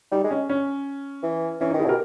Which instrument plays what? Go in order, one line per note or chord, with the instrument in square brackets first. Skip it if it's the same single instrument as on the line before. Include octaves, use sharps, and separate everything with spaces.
[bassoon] G3 [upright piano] D#4
[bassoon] G#3
[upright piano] C#4
C#4
[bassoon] E3
[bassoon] E3 [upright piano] C#4
[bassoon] D#3 [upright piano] D#4
[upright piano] E4 G#4
[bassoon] B2 [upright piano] G4 A#4